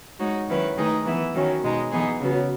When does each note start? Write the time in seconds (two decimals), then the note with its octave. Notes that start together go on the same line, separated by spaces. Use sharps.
0.19 G#3 D#4 F#4 C#5
0.48 D#3 F#3 C#4 E4 B4
0.76 D#3 A3 D#4 G#4 B4
1.05 E3 B3 E4
1.34 D#3 F#3 C#4
1.63 B2 G#3 D#4
1.91 E3 B3 D#4 G#4
2.20 C#3 F#3 B3